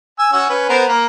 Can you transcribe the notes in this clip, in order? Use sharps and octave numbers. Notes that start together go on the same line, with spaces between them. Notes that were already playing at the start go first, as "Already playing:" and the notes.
G#5 E6
C#4 F#4 E6
C#4 B4
B3 A#4 C5
A#3